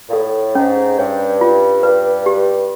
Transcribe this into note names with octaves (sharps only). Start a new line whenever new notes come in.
A#2
A2 A4
G#2 C#4
G2 C#5
F4
G2 B4
G4